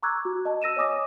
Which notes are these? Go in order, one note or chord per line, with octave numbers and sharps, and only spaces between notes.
A#5 C#6 D6 E6 F#6 G#6
F#4
D#5 A5
E6 A#6 D#7 E7
C#5 D#5 G#5 D6 D#6 A#6